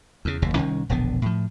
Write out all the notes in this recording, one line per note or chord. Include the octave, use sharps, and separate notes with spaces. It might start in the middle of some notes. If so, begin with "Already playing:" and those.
E2 C#3
F#1 D#2 C3
C2 D#3 C#4
E1 A#1 D3 B3
A2 F3